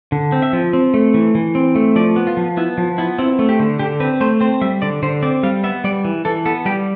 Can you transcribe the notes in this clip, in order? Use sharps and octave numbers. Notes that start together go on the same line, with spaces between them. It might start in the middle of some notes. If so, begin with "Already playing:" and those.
D3
C4
E5
F3
C4
A3
E3
E3
C4
A3
F3 D5
B3
F4
F3
B3 E4
F3
B3 E4
C4 E4
A3
G4
D3
D3 G4
C4 B4
A3 C5
C4 C5
G3 E5
D3 D5
D3 C5
C4 D5
G3 F5
B3 E5
G3 D5
E3
E3 A4
B3 A4
G3 G4